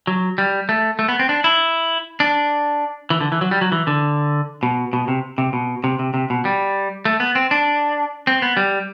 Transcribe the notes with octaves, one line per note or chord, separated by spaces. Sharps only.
F#3
G3
A3
A3
B3
C4
D4
E4
D4
E3
D3
E3
F#3
G3
F#3
E3
D3
B2
B2
C3
C3
B2
C3
C3
C3
B2
G3
A3
B3
C4
D4
C4
B3
G3